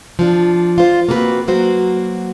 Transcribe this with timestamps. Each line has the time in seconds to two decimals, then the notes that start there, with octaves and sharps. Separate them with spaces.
0.19 F3 D4
0.78 F4 C5
1.09 A#3 C4 F#4 G#4 B4
1.47 F#3 A#3 F#4 C5